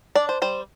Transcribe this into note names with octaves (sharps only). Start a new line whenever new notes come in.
D4 D5
C5
G3 C5